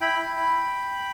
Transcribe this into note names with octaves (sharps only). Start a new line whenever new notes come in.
E4 G5 B5
E4
E4